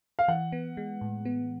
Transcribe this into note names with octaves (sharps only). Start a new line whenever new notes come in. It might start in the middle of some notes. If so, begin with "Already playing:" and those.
F5
E3 F#5
B3
G#3
A2
B3